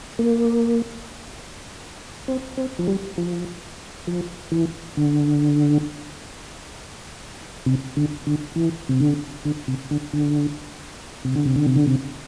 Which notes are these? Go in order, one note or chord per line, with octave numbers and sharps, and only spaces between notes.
A#3
C4
C4
F3
G3
F3
F3
E3
D3
C3
D3
D3
E3
C3
D3
D3
C3
D3
D3
C3
D3
C3
D3
C3
D3
C3